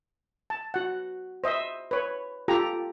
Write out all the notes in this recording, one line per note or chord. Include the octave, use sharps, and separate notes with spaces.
A5
F#4 F#5
C5 D#5 E5
B4 C#5
F4 G4 A4 A#5